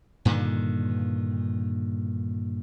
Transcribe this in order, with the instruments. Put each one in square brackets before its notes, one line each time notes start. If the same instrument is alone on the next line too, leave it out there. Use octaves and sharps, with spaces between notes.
[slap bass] G2 A#2 D3 D#3